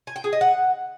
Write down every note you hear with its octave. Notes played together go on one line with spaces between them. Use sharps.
G#5
G5
G#4
D#5
F#5